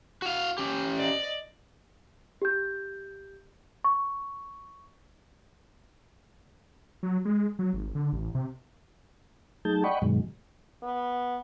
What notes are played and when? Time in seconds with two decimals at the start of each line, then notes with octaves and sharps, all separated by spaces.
0.22 F#4 F5
0.58 C#4 G4
0.98 D5 D#5
2.42 G4 G6
3.84 C#6
7.03 F#3
7.25 G#3
7.59 F#3
7.73 G#1
7.95 D3
8.13 A1
8.35 C3
9.65 F#3 A3 D#4 G#4 A5 G6
9.84 D5 D#5 F#5 G5 B5 C#6
10.02 G2 B2 D#3 F#3 G#3
10.83 B3